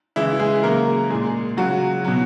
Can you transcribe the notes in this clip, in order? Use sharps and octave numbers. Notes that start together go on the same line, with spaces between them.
C#3 E3 G#3 E4
G#3 G#4
C#3 F#3 A#3 A#4
A#2 G#3 G#4
C#3 F#3 F#4
B2 F#3